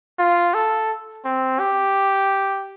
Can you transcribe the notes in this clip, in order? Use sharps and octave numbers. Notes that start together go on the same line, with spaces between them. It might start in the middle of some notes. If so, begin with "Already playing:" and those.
F4
A4
C4
G4